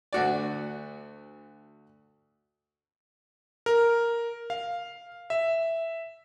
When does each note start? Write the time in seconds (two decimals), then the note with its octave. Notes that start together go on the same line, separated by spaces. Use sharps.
0.13 D2 F#4 D5
3.66 A#4
4.50 F5
5.30 E5